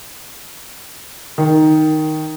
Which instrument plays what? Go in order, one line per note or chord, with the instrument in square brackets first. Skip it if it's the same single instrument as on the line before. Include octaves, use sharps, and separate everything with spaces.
[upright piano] D#3